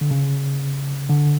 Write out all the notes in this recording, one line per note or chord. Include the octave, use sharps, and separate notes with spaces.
D3
C#3
D3